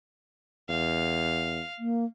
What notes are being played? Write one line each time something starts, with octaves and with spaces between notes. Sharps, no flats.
E2 F5
A#3